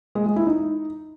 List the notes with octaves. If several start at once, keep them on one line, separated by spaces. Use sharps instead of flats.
G#3
G#3
E4
D#4